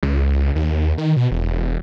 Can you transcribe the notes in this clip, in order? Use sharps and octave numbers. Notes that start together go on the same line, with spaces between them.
C#2
D#2
D#3
B2
E1